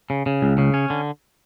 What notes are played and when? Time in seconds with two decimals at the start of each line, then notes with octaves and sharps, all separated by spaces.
0.10 C#3
0.26 C#3
0.42 C#2
0.58 C#3
0.74 C#4
0.90 D3